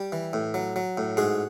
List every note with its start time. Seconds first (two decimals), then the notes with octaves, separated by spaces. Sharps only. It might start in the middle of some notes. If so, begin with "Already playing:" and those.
Already playing: G3
0.12 E3
0.33 A2
0.54 F#3
0.76 F#3
0.97 A2
1.17 G#2 F#4 G#4